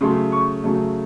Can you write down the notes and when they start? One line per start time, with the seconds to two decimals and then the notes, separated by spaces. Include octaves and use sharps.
0.01 C#3 F#3 A3 C6
0.32 C#6
0.64 C#3 F#3 A3